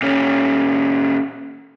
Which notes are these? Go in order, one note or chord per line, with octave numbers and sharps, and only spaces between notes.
A#2 C#4